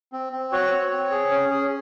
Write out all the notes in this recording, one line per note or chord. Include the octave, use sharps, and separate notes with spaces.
C4
C4
F#4 C#5
C4
C4
G#4
C#4
G#4